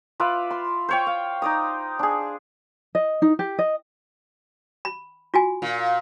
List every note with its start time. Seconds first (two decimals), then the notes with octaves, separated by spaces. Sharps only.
0.20 F4 B4 D5 E5
0.51 C6
0.89 C5 C#5 G5
1.07 F5
1.42 D#4 D5 D#6
1.99 D4 G#4
2.95 D#5
3.22 D#4
3.39 G4
3.59 D#5
4.85 B5
5.34 F4 F#4 G#5
5.62 A#2